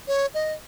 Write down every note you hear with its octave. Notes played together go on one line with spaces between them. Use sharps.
C#5
D#5